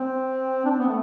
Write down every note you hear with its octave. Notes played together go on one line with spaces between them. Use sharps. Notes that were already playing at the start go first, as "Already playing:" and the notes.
Already playing: C4
D4
C4
B3
A3